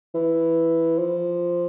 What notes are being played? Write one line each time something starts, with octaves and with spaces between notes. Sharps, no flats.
E3
F3